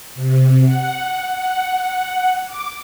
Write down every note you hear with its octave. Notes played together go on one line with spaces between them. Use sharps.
C3
F#5
F#5
D6